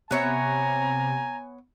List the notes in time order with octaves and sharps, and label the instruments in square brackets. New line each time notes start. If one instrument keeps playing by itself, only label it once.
[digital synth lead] C3 [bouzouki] B3 C#5 E5 [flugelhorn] G#5 [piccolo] A#5